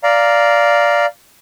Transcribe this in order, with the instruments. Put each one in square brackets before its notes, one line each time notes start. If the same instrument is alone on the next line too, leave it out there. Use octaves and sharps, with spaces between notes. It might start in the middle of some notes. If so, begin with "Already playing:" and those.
[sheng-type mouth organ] D5 F5 A#5